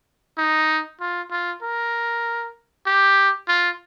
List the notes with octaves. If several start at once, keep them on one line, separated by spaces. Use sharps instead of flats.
D#4
F4
F4
A#4
G4
F4